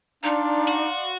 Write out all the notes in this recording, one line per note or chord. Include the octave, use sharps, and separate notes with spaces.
D4 D#4 D5 F5 C6
F#4